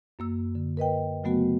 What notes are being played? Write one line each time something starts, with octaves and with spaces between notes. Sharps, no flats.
F#2 A#3 E6
D3
A#4 B4 D#5 G5
C#3 F#3 A3 B3 F#4